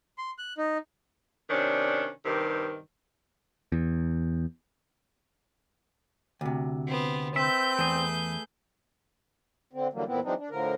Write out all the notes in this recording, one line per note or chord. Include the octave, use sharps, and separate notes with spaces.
C6
F#6
D#4
C3 D#3 C#4 D4
G2 C3 D#3
E2
D2 C3
B3 C4
C4 B4 E5 G6
E2 A3 G#4
D3 C4
D3 E3 F#3 G3 A#3
E2 A#2 B3 C4 E4
E3 F#3 G#3 C4 D4 D#4
D4
A2 D3 F3 A#4